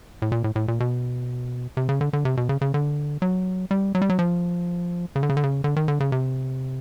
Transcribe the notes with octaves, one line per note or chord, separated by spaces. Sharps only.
A2
A#2
A2
A2
A#2
B2
C3
C#3
D3
D3
C3
B2
C#3
C#3
D3
F#3
G3
F#3
G3
F#3
F3
C#3
D3
C#3
D3
C#3
D3
D#3
D3
C#3
C3